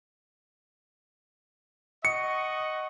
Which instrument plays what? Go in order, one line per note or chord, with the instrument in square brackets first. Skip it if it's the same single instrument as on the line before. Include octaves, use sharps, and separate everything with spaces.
[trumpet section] D#5 F#5 C#6 [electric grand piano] C#7